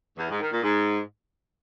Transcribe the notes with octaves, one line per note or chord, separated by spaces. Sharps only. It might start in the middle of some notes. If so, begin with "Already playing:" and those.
E2
G#2
D#3
A#2
G#2